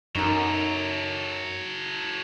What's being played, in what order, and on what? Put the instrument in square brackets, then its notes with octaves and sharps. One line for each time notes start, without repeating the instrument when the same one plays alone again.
[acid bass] F#2 [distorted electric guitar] F#3 A4 [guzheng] D#4 A#4